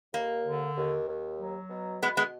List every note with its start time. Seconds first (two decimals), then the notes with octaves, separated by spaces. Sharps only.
0.14 D#2 A#3
0.46 D3
0.77 D#2
1.08 D#2
1.39 F#3
1.70 B2
2.02 B2 G#3 B3
2.17 G#3 B3